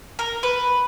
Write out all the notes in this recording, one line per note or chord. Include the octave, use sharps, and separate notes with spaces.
A#4
B4